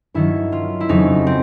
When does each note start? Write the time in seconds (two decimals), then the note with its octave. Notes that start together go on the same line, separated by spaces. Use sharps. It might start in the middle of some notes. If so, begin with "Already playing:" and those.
0.14 G2 D#3 F#3 E4
0.52 F4
0.80 E4
0.89 F2 C#3 F#3 D#4
1.27 C4